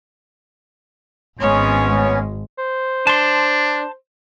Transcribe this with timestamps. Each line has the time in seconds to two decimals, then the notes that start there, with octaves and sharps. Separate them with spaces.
1.40 G#1 G#3 B3 C#4 C#5
2.58 C5
3.07 D4 A5 C6